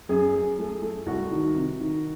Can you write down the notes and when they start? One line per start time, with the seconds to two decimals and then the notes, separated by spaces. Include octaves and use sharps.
0.09 F#2 G#4
0.34 F#2
0.59 A3
0.82 A3
1.06 C2 F#4
1.31 D#3
1.55 C3
1.80 D#3